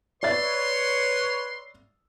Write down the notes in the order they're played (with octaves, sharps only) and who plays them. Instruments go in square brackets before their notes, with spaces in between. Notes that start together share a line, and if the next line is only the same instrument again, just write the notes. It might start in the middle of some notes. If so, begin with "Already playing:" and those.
[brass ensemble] B4 C#5 [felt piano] D5 E5 A6 [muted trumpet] C6